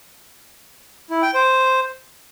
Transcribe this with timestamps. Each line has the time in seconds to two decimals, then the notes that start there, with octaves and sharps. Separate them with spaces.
1.10 E4
1.22 G5
1.34 C5